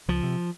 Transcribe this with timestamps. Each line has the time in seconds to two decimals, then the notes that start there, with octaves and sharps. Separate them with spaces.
0.08 C#2 F3
0.23 C3